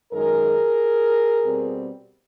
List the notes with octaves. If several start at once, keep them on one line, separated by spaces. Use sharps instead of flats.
F#2 D#3 G#3 G#4 A#4
B2 G3 C4